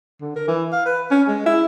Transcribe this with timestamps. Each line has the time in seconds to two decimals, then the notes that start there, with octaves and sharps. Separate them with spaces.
0.21 D3
0.36 A#4
0.48 E3
0.72 F5
0.86 B4
1.11 C#4
1.28 G#3
1.46 E4